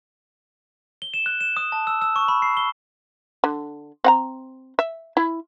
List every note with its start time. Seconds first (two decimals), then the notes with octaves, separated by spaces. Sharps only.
1.02 G7
1.14 E7
1.26 F#6
1.41 E7
1.57 D#6
1.72 A5
1.87 E6
2.01 E6
2.16 C#6
2.28 B5
2.42 C7
2.57 G7
3.44 D3
4.04 C4 F#5 A#5
4.79 E5
5.17 E4